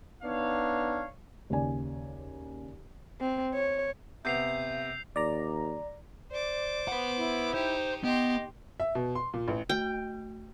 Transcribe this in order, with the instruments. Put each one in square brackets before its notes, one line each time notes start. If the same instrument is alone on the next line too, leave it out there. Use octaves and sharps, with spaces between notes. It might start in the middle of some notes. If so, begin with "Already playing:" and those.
[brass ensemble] B3 D4 D#4 C#5 F5
[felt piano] D#2 C#3 D5 G#5
[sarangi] C4
C#5
[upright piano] C3 B3 [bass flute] E5 [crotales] G6 C7 F7
[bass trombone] D#2 [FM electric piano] D5 A#5
[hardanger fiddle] C5 D6 [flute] D5
[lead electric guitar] B4 F#5
[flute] E4
[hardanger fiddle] D#4 G4 [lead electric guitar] C5
[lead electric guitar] B3 [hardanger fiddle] G4 C6 [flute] D#5
[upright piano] E5
B2
C6
A#2
A1
[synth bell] A3 F#4 [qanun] G5